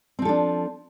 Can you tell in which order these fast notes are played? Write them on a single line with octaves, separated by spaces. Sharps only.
C4 F3 A4 D4